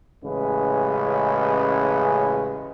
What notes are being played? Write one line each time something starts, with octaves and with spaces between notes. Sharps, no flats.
A1 C#3 G#3 B4